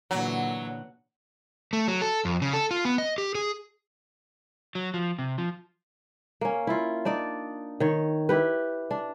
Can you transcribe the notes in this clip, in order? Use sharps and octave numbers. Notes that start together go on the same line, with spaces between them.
A#2 D3 E3 F#3
A3
F#3
A4
F2
C#3
A4
F4
B3
D#5
G4
G#4
F#3
F3
C3
F3
A#3 C#4
E4 F4
D4 D#4 D5
D#3 C#5
E4 G4 B4
D4